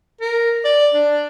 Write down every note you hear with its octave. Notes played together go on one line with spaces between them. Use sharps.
A#4
D5
D4